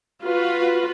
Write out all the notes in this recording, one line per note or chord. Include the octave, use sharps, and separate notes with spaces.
F4 F#4 B4